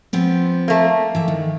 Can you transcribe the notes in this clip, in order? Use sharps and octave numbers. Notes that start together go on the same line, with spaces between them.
F3 B3 C4
A3 A#3
E3 E5
D#3